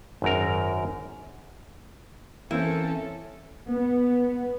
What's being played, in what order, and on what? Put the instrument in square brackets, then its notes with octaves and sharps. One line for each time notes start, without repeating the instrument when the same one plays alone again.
[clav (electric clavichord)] G#1 F#2 A#4
[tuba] E3 [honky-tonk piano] A#3 C4 [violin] C#4 A4 [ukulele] E4
[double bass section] B3